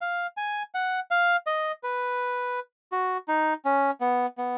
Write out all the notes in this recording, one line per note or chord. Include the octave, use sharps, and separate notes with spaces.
F5
G#5
F#5
F5
D#5
B4
F#4
D#4
C#4
B3
B3